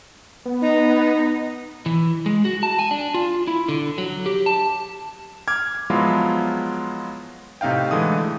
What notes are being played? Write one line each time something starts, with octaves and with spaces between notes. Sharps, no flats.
B3
D#4
E3
G#3
F#4
A5
G#5
D4
F4
E4
D3
F#3
G4
A5
D6 F6 G#6
F3 F#3 G#3 B3 E4 F4
A2 C3 D#4 F5 G5
D3 E3 G#3 A3 D#6